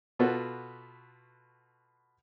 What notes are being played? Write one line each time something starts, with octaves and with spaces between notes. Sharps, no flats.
B2 F4 F#4 A4 B4